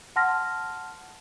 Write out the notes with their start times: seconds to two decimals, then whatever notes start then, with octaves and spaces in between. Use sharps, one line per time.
0.16 F#5 A5 C6 F6 A#6